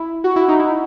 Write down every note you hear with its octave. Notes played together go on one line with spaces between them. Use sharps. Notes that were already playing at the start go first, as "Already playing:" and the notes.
Already playing: E4
F#4
E4
D#4
E4